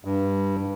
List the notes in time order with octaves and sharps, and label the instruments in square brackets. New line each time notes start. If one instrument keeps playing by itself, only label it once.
[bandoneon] G2